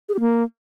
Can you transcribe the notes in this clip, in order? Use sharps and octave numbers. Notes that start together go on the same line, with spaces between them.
G#4
G4
A#3